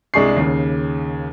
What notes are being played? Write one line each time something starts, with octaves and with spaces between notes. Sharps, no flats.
C2 G#3 D4 G#4 C#6 C7
D#2 C#3